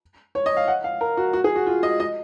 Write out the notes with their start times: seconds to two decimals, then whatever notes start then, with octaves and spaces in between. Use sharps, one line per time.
0.35 C#5
0.46 D#5
0.57 F5
0.68 F#5
0.84 F5
1.01 A#4
1.17 F#4
1.33 F#4
1.44 G#4
1.56 F#4
1.66 F4
1.83 D#5
2.00 D#5